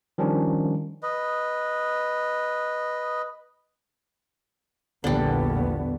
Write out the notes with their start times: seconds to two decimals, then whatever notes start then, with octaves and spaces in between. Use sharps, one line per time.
0.18 D#3 F3 G3 C#4 D4
1.03 B4 D#5
5.04 A#1 E2 D3 G3 B3